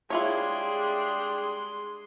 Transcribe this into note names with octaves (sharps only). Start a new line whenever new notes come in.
G3 G#3 D4 E4 F4 G#4 C#5 C6